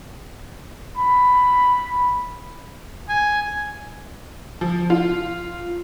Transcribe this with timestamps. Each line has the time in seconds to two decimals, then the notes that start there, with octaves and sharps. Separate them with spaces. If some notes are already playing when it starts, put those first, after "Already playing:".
0.97 B5
3.09 G#5
4.61 F3
4.90 F4